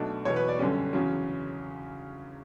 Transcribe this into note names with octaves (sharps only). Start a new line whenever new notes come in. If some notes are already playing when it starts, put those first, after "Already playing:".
Already playing: B1 B2 A3 D4
E2 B2 F#3 B3 C#5
B4
D5
G1 F#2 D3 G3 C#4
E2 C#3 F#3 C#4